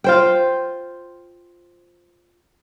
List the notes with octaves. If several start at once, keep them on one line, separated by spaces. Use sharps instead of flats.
F4 C5 G5